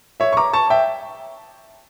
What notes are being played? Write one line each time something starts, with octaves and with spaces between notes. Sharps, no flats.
C#5 E5
C#6
A#5 D6
A5 C#6
E5 G5